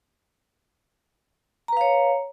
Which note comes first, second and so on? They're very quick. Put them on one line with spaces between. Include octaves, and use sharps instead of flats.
A#5 B4 F5 C#5